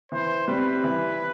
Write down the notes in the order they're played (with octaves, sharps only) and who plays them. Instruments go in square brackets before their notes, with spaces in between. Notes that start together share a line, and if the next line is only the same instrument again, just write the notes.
[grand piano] E3 [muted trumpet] C5
[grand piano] G3 C4 [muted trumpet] B4
[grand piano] E3